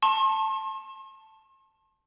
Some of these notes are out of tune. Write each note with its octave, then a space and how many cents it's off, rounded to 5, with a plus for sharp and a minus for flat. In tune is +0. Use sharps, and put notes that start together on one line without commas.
A5 +0 C6 +45